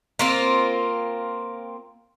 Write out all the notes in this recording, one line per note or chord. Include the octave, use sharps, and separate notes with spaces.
A#3 C4 F4